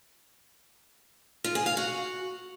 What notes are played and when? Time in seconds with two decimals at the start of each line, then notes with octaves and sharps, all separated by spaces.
1.44 F4
1.55 G#4
1.66 F5
1.77 F#4